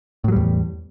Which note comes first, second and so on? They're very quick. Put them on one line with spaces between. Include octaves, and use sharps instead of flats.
A2 F#3 G3 E2